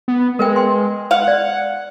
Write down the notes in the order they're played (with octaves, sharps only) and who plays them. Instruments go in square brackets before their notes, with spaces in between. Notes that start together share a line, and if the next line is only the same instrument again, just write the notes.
[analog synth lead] B3
[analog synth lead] G#3 [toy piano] A#4 B4 G5
[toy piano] B4 G5 C6
[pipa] F5 [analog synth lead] F#5
[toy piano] D5